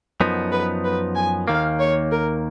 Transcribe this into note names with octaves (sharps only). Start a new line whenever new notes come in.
F#2 F3 B3 D#4
B4
B4
G#5
D#2 D#3 A#3 F5
C#5
A#4